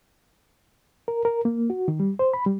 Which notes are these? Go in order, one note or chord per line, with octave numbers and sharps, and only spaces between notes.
A#4
A#4
A#3
F#4
D#3
G3
C5
B5
G3